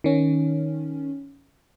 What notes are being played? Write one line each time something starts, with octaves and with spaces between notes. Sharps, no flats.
D#3 C#4